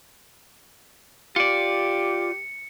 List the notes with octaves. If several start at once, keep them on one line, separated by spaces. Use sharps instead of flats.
F4 G4 D5 C#7